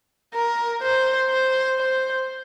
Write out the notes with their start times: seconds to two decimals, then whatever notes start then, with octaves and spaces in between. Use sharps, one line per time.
0.34 A#4
0.83 C5
1.30 C5
1.79 C5